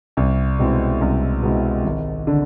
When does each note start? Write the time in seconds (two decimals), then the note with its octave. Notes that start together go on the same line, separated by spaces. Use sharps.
0.17 C2
0.59 B2 G#3 C4 E4
1.01 C2
1.42 B2 G#3 C4 E4
1.85 G#1
2.27 D3